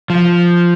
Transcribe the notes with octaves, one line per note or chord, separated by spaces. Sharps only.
F3